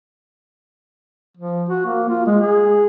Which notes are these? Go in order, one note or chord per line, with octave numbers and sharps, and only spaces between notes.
F3
F#4
A#3
F4
G#3
G#4